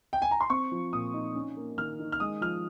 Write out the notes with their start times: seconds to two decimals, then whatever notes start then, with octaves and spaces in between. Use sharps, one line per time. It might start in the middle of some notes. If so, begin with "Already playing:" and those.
0.13 G5
0.22 G#5
0.31 A#5
0.41 C6
0.50 C4 C#6
0.72 F3
0.93 A#2 D#6
1.14 D#4
1.35 C#4
1.57 A#3
1.78 D#3 F6
2.00 D#3
2.12 F6
2.20 G#3 D#6
2.41 F3 F6